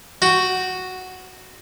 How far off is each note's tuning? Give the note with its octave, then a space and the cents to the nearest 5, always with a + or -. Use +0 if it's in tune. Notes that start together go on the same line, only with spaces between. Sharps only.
F#4 +0 G5 -20